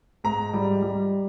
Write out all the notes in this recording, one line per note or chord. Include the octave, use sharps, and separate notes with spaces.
G#2 A#5
G3
G3